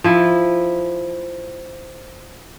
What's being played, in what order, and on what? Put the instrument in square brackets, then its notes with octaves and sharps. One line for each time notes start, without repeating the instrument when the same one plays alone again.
[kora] F3 E4